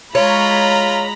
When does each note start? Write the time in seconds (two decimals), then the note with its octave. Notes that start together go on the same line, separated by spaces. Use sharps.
0.15 G#3 F4 C#5 A#5 B5